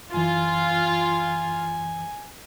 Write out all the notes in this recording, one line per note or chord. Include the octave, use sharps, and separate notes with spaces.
F#2 E3 F4 G#5